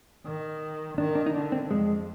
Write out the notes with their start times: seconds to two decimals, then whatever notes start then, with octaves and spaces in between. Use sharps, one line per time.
0.25 D#3
0.98 D#3 D4
1.15 D4
1.26 D#4
1.34 D3 D4
1.52 C4
1.71 F2 G#3